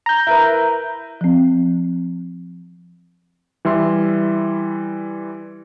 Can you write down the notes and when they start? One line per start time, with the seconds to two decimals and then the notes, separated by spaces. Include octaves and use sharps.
0.06 A#5 G6
0.27 E4 A#4 B4
1.21 F3 C4
3.65 E3 G3 E5 C6